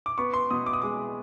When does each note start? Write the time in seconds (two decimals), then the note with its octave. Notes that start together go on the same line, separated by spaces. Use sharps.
0.06 D6
0.18 B3 C#6
0.34 C6
0.50 B2 D#6
0.66 D6
0.73 D#6
0.82 G#3 D6